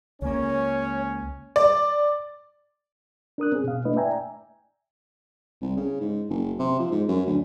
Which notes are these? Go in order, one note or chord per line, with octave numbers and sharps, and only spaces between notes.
C#2 A#3 C#4 C#5
D5
D4 A#4 D#6 F#6
C4 C#4 G#4
B2 F5
A3 A#3 D4 E4 B4 D#5
D5 E5 G5 G#5 A#5
C2
C#3
G#2
F#1
C3
F3
G#2
F#2
D2